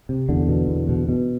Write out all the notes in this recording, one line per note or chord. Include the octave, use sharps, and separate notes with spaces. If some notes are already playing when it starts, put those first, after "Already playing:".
C3
E2 D3
B2
E2
B2
B2